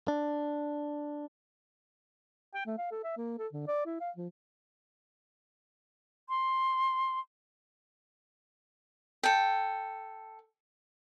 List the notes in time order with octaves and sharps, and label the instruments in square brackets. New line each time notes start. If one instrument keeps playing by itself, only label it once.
[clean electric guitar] D4
[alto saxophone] G5
A3
F5
A4
E5
A#3
A4
D3
D5
E4
F5
F3
[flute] C6
[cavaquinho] A4 G5